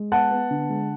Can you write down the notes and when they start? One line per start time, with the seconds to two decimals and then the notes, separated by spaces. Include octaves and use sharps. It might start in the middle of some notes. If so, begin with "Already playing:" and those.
Already playing: G#3
0.12 B3 F#5 A5
0.31 B3
0.51 D3
0.70 G#3